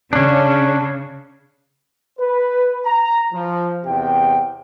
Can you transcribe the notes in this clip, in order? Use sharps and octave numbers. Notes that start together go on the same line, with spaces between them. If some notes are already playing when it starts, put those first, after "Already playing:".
C#3 C#4 D4
B4
A#5
F3
E2 C3 G5